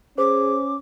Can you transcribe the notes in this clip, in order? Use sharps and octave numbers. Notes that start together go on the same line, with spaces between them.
C#4 G#4 C5 D6